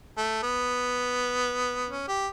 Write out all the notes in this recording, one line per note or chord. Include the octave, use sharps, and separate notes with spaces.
A3
B3
C#4
G4